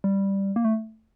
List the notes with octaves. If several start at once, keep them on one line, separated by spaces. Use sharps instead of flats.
G3
A#3
A3